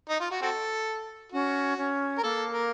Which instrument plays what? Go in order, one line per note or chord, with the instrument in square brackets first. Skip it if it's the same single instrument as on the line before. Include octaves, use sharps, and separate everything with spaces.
[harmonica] D#4
F4
F#4
C4 F#4 A4
[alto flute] C#4 [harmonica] F#4
[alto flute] C#4
[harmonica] A#4
[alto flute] A#3 [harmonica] A4
[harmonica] A#4